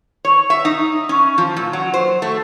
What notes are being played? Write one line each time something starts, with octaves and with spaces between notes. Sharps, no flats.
C#5
E5
D#4
C#4
F3
A#2
F#3
C5
A3